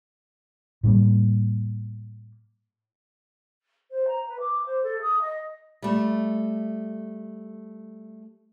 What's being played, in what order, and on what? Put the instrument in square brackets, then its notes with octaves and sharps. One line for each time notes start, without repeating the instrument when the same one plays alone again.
[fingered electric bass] A2 G3 A#3
[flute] C5
A#5
B4
D6
C5
A4
D#6
D#5
[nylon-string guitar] G3 A3